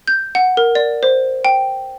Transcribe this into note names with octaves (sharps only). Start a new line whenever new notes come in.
G6
F#5
A#4
D5
C5
G5